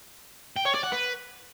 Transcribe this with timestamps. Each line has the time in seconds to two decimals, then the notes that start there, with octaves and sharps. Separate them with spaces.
0.56 G5
0.65 C#5
0.74 D5
0.83 F#5
0.92 B4